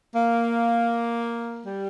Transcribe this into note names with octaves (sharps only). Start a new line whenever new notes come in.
A#3
G3